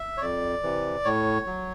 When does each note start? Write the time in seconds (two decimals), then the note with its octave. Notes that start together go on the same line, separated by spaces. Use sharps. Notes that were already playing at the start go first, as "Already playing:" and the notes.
Already playing: E5
0.17 C#5
0.22 F2 D5
0.63 C3 E3
1.05 A2 C#5
1.46 F#3